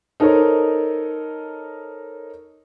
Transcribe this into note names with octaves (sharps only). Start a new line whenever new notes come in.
D#4 A4 A#4 C5 C#5 D#5